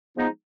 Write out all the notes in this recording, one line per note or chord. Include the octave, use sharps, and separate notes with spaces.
F3 G#3 B3 D#4